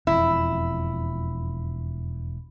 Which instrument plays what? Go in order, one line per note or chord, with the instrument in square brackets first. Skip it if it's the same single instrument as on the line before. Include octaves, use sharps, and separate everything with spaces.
[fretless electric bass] E1 F2 [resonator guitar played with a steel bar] E4